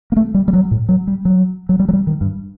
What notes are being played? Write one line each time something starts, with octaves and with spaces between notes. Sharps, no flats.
A#3
A3
G3
G3
F#3
A2
F#3
G3
F#3
F#3
G3
F#3
G3
D#3
G2